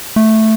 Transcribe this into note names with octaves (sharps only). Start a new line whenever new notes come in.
A3